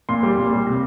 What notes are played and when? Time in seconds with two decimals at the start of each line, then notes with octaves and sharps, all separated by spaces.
0.09 A#2 C6
0.23 G3
0.38 A#2
0.53 G3
0.66 C3